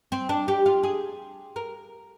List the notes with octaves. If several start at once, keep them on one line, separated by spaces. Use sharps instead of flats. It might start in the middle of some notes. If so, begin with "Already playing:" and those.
C4
D4
G4
F4
G#4
A#4